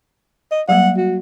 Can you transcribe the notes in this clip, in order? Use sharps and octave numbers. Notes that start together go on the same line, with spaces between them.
D#5
F#3 G3 A#3 F#5
F#4